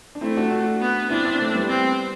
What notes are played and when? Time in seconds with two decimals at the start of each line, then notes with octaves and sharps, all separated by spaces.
0.15 D4
0.21 A3 C4 E4
0.37 D4 F#4
0.51 D4 F#4
0.81 B3
1.10 C4 D4 E4
1.25 C4 E4
1.39 A3 C4
1.54 G3 B3
1.69 C4